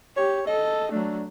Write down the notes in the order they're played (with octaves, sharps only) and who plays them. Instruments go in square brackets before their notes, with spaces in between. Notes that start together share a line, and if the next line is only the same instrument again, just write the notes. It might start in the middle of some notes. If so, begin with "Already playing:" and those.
[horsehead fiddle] G4 [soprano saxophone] C#5
[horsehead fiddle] A4 [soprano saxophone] D#5
[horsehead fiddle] F#3 A3 [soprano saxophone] D4